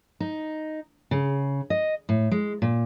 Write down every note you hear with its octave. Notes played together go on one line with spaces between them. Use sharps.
D#4
C#3
D#5
A2
G#3
A#2